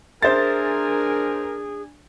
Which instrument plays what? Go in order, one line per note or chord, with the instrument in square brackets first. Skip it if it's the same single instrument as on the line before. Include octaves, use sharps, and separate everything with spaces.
[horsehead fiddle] D4 G#5 [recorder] G#4 [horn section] A#4 [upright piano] C5 E5 A6